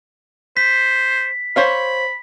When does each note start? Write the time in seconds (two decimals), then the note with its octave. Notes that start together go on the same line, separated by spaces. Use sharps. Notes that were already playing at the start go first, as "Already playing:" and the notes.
0.57 C5 B6
1.56 C5 C#5 F5 B5